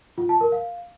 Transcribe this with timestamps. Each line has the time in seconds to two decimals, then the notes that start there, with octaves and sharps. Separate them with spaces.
0.18 F4
0.29 A5
0.41 A#4
0.52 F5